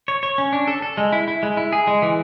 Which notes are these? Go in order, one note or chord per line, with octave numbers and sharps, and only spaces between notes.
C#5
C#5
C#4
D4
A4
A4
G#3
E4
E4
G#3
E4
G#4
G#3
E3